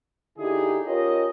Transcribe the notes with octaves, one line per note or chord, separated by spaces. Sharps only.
D3 D#4 E4 G4 G#4
C#4 F4 G4 A#4 C#5 D#5